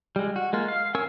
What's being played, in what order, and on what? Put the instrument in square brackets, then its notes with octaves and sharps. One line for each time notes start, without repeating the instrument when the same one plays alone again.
[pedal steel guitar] G3 G#3
F#4
G#3 A#3 F4
F5
C#4 A#4 G#5 C#6 E6